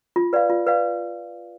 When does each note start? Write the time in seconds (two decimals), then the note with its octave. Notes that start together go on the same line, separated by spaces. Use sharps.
0.16 F4
0.33 B4 D5 F5
0.50 F4
0.67 B4 D5 F5